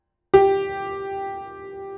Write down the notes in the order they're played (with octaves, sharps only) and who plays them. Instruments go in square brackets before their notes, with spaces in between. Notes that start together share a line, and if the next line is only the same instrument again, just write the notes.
[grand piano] G4